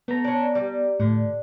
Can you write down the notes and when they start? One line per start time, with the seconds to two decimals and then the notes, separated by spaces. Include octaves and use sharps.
0.08 A3 B3 A#5
0.24 C#4 D4
0.55 G3
1.00 A2 D3